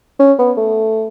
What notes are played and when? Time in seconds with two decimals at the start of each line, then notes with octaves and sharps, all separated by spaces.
0.20 C#4
0.39 B3
0.57 A3